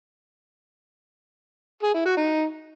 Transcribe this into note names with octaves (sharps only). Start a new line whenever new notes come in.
G#4
E4
F#4
D#4